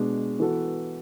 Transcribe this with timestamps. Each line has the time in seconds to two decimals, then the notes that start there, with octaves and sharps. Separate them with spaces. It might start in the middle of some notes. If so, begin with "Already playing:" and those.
Already playing: B2 G#3 D4
0.39 E3 B3 F#4 A4